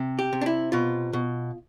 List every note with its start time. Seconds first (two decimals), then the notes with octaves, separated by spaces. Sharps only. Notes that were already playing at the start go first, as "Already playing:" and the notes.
Already playing: C3
0.19 G4
0.33 C3
0.41 D4
0.46 E4
0.72 B2 F4
1.13 B2